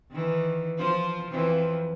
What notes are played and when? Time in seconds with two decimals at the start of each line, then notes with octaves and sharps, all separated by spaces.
0.10 D#3 E3
0.78 F3 F4 C5
1.31 F2 E3 F3